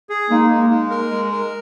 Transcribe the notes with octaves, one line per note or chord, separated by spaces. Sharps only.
G#4
G#3 A#3 D#4
G#3
G#3
A#4
G#3
A#4